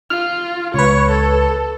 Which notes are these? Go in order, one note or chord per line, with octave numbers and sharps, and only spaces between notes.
F4 F6
C#2 B4 C#5
A4